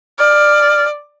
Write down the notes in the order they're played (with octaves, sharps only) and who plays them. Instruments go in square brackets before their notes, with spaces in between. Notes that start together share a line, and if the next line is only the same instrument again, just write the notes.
[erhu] D5 [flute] F6